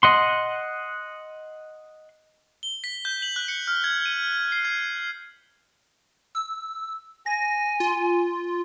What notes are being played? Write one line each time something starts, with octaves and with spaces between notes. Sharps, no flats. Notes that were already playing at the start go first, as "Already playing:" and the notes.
D#5 F#5 C6
G7
B6
G6
F#7
F#6
C#7
F6
G#6
D#7
C7
G#6
E6
G#5 A#6
F4